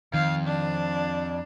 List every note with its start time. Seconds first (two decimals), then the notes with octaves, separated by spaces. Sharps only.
0.14 F2 D#3 F5
0.46 D4